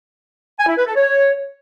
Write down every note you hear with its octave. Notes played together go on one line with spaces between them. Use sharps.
G#5
E4
B4
A4
C#5